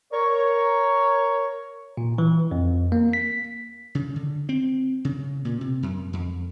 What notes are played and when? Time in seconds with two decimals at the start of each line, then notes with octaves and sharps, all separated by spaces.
0.12 A#4 C#5
1.97 A#2
2.18 E3
2.51 F2
2.92 A#3
3.13 B6
3.95 C#3
4.16 D3
4.49 C4
5.05 C#3
5.45 A#2
5.61 C3
5.83 F#2
6.13 F2